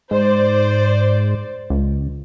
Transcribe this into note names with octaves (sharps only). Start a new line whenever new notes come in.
G#2 C5 D5
C#2